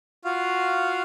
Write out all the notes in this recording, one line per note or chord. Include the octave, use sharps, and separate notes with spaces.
F4 F#4 F5